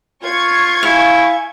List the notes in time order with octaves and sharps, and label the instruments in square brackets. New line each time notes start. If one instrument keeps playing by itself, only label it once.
[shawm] F4 [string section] C#6 G#6
[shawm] E4 [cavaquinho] F5 [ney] G#5